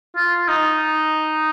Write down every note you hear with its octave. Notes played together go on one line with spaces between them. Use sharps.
F4
D#4